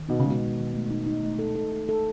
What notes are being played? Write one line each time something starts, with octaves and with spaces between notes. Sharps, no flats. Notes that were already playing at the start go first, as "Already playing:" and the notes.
Already playing: D#3
B2 D#4
C#3
B2 G#3
G#3
D#3
A3
D#4
D#4
A3
A4
A4
A4
A4